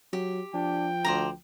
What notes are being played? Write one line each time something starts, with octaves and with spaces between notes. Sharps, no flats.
F#3 G4
F3 D4 G5
D2 C5 D5 A#5